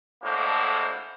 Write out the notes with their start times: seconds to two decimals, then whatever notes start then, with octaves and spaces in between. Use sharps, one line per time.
0.23 A1 A2 D3 G#3 A#3 C5